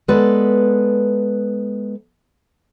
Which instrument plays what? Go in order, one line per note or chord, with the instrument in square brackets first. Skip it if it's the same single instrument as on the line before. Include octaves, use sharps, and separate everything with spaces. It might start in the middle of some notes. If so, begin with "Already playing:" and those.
[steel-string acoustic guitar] G#3 B3 A4 B4 D5